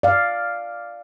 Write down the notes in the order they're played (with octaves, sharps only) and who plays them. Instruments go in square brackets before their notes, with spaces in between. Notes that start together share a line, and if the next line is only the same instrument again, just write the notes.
[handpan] D5 F5